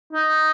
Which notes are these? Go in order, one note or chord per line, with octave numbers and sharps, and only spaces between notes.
D#4